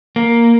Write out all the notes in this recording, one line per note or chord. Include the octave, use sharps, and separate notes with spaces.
A#3